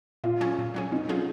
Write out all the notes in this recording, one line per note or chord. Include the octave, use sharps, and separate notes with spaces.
A#2 F4
F#3 C#4 G#4
A#2
F#3 C#4 G#4
B2 D#4
F#3 C#4 F4 G#4